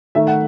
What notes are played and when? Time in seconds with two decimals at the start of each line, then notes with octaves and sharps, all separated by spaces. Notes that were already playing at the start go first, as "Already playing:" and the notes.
0.15 D#3 A3 E5
0.27 F#5